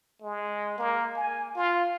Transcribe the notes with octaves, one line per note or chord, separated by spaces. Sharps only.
G#3
A#3
G#5
F4